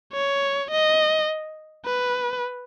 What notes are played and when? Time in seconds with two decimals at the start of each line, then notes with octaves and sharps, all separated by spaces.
0.13 C#5
0.71 D#5
1.86 B4